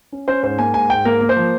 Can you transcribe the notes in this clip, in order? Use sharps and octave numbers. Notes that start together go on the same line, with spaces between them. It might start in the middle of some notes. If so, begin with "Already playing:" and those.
C#4
C#4 C5
G#2 C5
A#3 G#5
G#2 G#5
G#2 G5
A#3 A#4
A#3
C5
F3